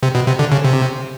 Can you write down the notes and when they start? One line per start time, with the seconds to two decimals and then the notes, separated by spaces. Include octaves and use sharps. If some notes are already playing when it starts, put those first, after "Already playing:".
0.03 C3
0.15 B2
0.27 C3
0.39 D3
0.52 C#3
0.64 C3